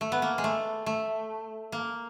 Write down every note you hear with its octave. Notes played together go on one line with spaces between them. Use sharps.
A3
B3
A#3
G#3
A3
A3
A#3